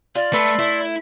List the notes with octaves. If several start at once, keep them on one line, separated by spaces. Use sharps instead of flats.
F4 D5
A3 A4 B4 A5 C6
A3 E4